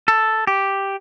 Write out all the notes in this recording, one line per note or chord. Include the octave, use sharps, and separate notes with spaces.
A4
G4